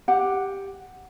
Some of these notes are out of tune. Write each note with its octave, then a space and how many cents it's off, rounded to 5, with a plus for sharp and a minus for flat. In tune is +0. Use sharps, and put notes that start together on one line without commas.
G4 +5 F#5 +0